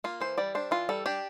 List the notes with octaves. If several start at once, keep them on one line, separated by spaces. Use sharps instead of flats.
A#3 F4
E3 C5
G3 D5
D4 C5
E3 F4
G3 A4
D4 G4